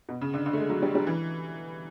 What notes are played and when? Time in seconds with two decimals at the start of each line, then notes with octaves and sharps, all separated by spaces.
0.09 B2
0.21 C#3
0.34 D3
0.46 D3
0.53 A3
0.58 G#3
0.69 F#3
0.82 G3
0.95 G3
1.07 E3